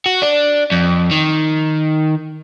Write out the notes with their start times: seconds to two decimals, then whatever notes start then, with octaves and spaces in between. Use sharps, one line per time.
0.06 F#4
0.22 D4
0.72 F2
1.11 D#3